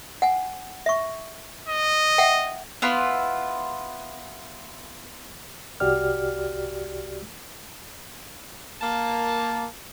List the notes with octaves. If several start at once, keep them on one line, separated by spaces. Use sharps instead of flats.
F#5 G#5
E5 C#6
D#5
E5 F#5 G5
B3 E4 F4
C2 F#4 G4 D5 F6
A#3 A5